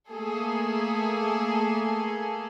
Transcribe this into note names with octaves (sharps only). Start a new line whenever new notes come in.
A3 A#3 G#4 A4